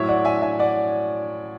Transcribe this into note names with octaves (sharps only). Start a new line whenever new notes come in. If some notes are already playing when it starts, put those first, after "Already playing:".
Already playing: A2 F#3 C#5 E5
D5 F#5
E5 G#5
E5 G#5
D5 F#5